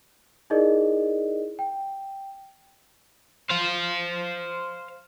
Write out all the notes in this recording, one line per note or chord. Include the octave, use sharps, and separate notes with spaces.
D#4 E4 G#4 A#4 D5 D#5
G5
C5 F5